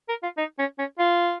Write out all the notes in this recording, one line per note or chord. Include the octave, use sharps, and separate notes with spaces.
A#4
F4
D#4
C#4
C#4
F4